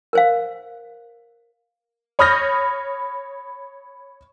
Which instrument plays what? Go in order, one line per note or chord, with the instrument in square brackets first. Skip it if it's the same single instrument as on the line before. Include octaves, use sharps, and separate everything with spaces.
[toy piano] A#4 C5 F5
[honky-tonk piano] C#5 B5 D#6 F6 G6 A#6